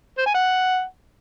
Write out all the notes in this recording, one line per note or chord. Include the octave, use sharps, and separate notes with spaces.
C5
G#5
F#5